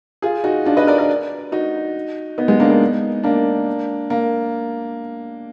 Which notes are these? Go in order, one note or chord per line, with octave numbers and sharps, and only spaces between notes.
F4 G#4
D#4 F#4
D4 F4
B4 D#5
A#4 D5
A#4 D5
D#4 F#4
B3 D#4
G#3 B3
A#3 D4
B3 D#4
A#3 D4
A#3